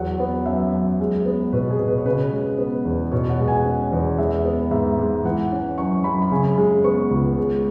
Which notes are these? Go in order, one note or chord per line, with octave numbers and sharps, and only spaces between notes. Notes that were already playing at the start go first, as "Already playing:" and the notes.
Already playing: E2 F#3 F#5
B3
F#2 E5
F#2
G#3
B3
B2 B4
G#4
B2
B4
C#5
C#3 B4
G#3
B3
E2
B2 C#5
F#5
G#3
G#5
C#4
E2
G#3 E5
B3
G#2 E5
G#2
E3 F#5
C#4
F#2 C#6
F#2 B5
B5
C#3 G#5
G#3
B3 C#6
C#2
G#3